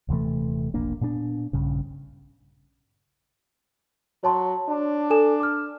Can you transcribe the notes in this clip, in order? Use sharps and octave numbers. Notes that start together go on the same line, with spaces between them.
D#1 C3 E3 A3
E1 A#1 A#3 D4
A#2 B3 C4 D4
A#1 G2 C#3
F#3 C#5 A5 C6
D4
A4 G#5 E7
D6 F6